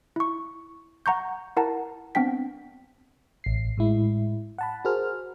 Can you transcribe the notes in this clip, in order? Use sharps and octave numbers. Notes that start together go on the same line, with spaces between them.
E4 C#6
F#5 A#5 C#6 G6
E4 A#4 F#5 A5 A#5
B3 C4 D4 G5 B6
A1 C7
A2 G#3 E4
F#5 A5 B5
F#4 G#4 A#4 C5 F6